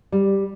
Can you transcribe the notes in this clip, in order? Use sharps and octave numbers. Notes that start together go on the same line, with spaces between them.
G3